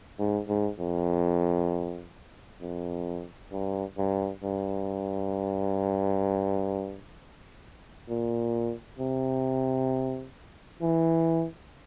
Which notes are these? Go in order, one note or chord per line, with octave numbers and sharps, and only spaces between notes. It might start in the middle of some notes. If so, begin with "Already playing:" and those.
G#2
G#2
F2
F2
G2
G2
G2
A#2
C3
E3